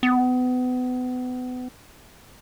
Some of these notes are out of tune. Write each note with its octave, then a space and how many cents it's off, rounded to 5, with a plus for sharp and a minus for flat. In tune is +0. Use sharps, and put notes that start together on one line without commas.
B3 +30